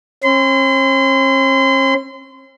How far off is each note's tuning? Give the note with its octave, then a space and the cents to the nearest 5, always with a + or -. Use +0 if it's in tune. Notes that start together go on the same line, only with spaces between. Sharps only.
C#4 -45 C6 -35